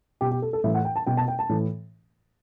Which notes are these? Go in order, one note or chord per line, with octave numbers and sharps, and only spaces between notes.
B2 G4
G4
A4
A4
A2 E3 E5
F#5
G5
A5
B2 G5
A5
G5
A5
A2 E3